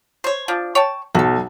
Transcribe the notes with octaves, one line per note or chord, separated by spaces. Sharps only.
C5 C#5
F3 D4
C#5 G5 A5
B1 F#4 A4